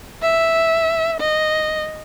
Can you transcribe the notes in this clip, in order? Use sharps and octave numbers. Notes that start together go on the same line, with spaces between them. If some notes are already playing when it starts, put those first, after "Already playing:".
E5
D#5